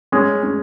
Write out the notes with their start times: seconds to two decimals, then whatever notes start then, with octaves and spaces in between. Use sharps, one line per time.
0.12 G#3 C#4
0.43 C#4